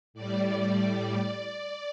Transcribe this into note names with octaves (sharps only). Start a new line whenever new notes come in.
A2 G3 D5